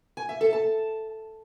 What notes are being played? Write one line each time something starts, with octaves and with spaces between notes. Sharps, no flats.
G#5
E5
A4
A5